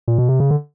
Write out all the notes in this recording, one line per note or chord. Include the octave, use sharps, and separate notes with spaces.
A#2
B2
C3
C#3
D3